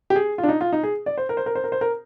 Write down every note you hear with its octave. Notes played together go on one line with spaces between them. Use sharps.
G4
G#4
F4
D4
D#4
F4
D#4
G#4
D5
C5
A#4
C5
A#4
C5
A#4
C5
A#4